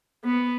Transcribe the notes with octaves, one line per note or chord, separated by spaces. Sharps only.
B3